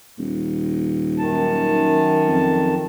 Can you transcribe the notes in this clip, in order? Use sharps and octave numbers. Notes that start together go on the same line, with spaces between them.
D#1
F#2 D#3 A5
F2